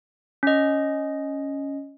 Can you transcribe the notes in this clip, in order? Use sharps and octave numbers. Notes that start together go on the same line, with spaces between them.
C#4 D#5